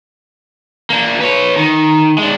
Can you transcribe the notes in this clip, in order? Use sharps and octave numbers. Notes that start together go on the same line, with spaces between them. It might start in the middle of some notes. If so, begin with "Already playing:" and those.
A#3 D4
B4 C#5
D#3
G#3 D4